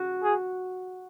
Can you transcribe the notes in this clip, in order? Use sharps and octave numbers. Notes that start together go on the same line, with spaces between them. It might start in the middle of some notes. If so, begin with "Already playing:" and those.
Already playing: F#4
G#4